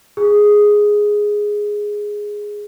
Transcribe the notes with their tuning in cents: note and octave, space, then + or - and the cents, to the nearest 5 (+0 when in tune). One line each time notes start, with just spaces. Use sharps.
G#4 +0